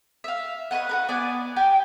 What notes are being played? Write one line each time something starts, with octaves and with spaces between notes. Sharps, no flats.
E5 F5
B4 C#5 D#5 F#5
F#4 A#4 B4
B3 D5 G#5
G4 G5 G#5